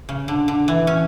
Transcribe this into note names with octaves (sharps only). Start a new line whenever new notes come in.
C#3
D3
D3
E3
C#4